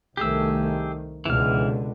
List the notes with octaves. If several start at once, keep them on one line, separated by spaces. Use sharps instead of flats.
C2 D#3 A3 G4 G#4 E6
C#2 B2 D3 E3 F6